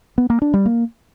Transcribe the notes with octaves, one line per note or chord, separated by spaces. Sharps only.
B3
A#3
D4
G3
A#3